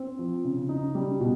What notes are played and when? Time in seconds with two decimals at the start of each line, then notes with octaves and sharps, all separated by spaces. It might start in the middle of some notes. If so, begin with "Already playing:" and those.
Already playing: C4
0.19 F3
0.44 C#3
0.69 D#4
0.95 G3
1.20 B2